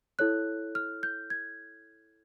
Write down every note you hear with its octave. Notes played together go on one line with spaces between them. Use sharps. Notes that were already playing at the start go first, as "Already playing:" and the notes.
E4 A4 C#5 F#6
F6
G6
G#6